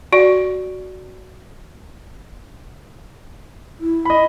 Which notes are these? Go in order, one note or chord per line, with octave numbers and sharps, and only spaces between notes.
F#4 D5
E4
D#5 B5